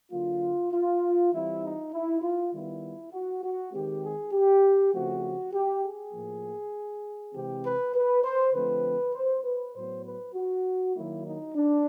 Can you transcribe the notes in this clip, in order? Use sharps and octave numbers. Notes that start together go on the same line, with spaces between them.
D3 F#3 A#3 F4
F4
E3 G3 C4 E4
D#4
E4
F4
D#3 G3 B3 E4
F#4
F#4
D#3 G#3 C4 G4
G#4
G4
C#3 F3 A3 C4 F#4
G4
G#4
A2 F3 A#3
C3 E3 G#3 C4 G4
B4
B4
C5
D3 F3 A3 C4 B4
C5
B4
A2 F#3 B3 C5
B4
F#4
D#3 F#3 A#3 E4
D#4
D4